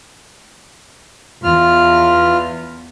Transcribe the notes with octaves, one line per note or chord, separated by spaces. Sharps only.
E2 F4 F6